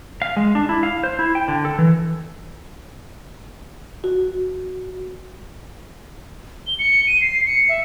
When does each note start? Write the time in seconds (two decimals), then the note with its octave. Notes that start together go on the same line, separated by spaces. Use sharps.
0.22 F5
0.37 G#3
0.55 D4
0.69 E4
0.83 F5
1.03 C5
1.19 E4
1.35 G5
1.48 D3
1.65 A4
1.78 E3
4.04 F#4
6.67 G7
6.79 C#7
7.07 D#7
7.21 C7
7.46 C#7
7.69 E5